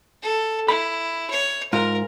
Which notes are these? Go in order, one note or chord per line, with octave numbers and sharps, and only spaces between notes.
A4
E4 B5
C#5
G#2 F4 A#4